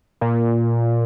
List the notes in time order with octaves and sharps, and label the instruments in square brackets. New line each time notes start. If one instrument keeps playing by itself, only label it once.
[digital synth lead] A#2